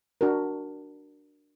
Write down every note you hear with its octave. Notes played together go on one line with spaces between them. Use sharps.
D4 F#4 A#4